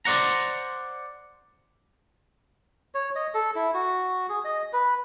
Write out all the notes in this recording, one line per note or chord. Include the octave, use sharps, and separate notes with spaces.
C5 D5 F#5 A#5
C#5
D#5
A4
E4
F#4
G#4
D#5
B4